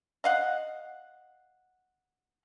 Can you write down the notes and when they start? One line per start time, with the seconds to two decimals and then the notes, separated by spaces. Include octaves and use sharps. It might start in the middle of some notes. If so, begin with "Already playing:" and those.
0.24 D#5 F5 F#5